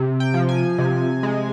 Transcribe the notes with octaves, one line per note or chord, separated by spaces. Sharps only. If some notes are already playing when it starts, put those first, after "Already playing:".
Already playing: C3
G5
F3
G#5
C3
G#3